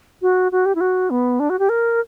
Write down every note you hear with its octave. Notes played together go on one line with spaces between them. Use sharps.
F#4
F#4
G4
E4
F#4
B3
D4
F#4
G4
A#4